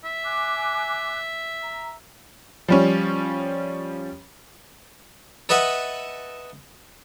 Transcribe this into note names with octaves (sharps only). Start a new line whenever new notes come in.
E5
G#5 D6 F#6
A#5
F3 G3 C#4
A4 B4 D#5 E5 F#5